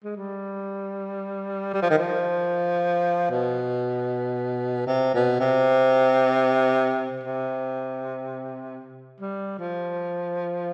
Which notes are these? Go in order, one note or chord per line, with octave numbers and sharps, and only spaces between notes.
G#3
G3
G3
F3
D#3
F3
B2
C3
B2
C3
C3
G3
F3